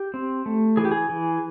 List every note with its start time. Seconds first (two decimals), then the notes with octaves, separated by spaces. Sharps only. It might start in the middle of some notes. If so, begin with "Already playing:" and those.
Already playing: G4
0.14 C4
0.46 A3
0.77 E3 G#4
0.85 G4
0.92 G#4
1.09 E3